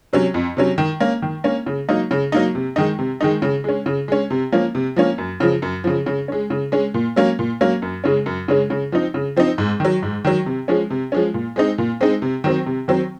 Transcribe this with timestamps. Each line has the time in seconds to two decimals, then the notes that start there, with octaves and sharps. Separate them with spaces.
0.13 C3 F#3 C#4
0.34 F2
0.57 C3 F#3 C#4
0.78 D#3
1.00 A#3 C#4
1.22 D#3
1.44 A#3 C#4
1.66 C#3
1.89 F#3 A#3 D#4
2.11 C#3
2.32 F#3 A#3 D#4
2.55 C3
2.76 D#3 G#3 D#4
2.99 C3
3.21 D#3 G#3 D#4
3.42 C#3
3.64 G#3 C#4
3.86 C#3
4.08 G#3 C#4
4.30 C3
4.52 F3 A#3 C#4
4.75 C3
4.96 F3 A#3 C#4
5.18 F#2
5.40 C#3 F3
5.62 F#2
5.84 C#3 F3
6.06 C#3
6.28 G#3 C#4
6.50 C#3
6.72 G#3 C#4
6.94 A#2
7.16 F#3 A#3 C#4
7.39 A#2
7.61 F#3 A#3 C#4
7.82 F#2
8.04 C#3 G#3 C#4
8.26 F#2
8.48 C#3 G#3 C#4
8.70 C#3
8.92 F3 C4 D#4
9.14 C#3
9.36 F3 C4 D#4
9.58 G#2
9.80 D#3 F#3
10.03 G#2
10.25 D#3 F#3
10.46 C3
10.68 F3 G#3 C#4
10.90 C3
11.12 F3 G#3 C#4
11.34 A#2
11.56 G#3 C4 D#4
11.78 A#2
12.01 G#3 C4 D#4
12.22 C3
12.44 D#3 F#3 C4
12.66 C3
12.88 D#3 F#3 C4